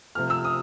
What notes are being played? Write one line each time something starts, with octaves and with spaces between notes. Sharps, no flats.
C3 F3 A3 F6
E6
D#6